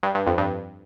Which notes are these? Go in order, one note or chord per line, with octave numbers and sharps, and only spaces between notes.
G2
G2
F2
G2